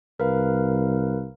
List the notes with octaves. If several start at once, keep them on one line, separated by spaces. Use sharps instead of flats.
C2 A#4 B4 F5